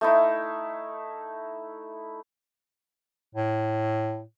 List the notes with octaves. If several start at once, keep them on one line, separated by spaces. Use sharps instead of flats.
A3 D#4 E4
A2